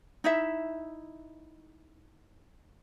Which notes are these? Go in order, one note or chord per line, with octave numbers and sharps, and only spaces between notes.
D#4 E4 E5